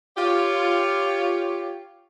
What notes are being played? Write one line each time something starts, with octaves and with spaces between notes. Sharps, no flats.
F4 G4 C#5